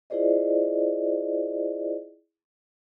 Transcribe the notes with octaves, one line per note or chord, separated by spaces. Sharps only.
E4 F4 G#4 C5 D5 D#5